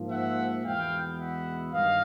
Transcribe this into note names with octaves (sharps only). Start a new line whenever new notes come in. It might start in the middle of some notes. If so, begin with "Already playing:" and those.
Already playing: G#2 F3 A#3
E5 F#5
E2 B2 G#3 B3 F5 G5
E5 F#5
G2 D#3 D#5 F5